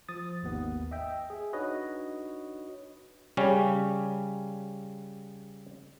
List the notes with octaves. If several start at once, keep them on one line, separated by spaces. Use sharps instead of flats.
F3 D#6 A6
G#1 D#2 B3 D#4
D#5 E5 G5
G#4 E5
D4 D#4 F#4 B4 C#5 D#5
C#3 G3 C#4